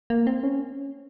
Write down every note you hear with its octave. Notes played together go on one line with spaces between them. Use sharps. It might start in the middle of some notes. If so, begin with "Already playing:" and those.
A#3
C4
C#4